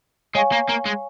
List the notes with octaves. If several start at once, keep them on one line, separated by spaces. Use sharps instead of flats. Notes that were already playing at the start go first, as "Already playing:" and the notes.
G#3 C#5 F5 G#5 C#6
A#3
A#3
G#3